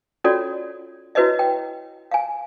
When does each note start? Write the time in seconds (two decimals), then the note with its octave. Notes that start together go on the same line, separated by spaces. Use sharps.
0.24 C#4 F4 F#4 A4 C#5 D5
1.15 E4 F#4 B4 C#5 D#5 E5
1.39 G5
2.11 F5 G#5